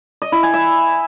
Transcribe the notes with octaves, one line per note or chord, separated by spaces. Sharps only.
D#5
E4
G#5
E5